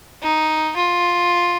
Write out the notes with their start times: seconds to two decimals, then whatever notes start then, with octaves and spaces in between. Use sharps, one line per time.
0.22 D#4
0.76 F4